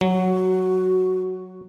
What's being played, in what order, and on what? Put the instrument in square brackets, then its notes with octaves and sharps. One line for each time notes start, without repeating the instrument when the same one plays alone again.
[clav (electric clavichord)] F#3 [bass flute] F#4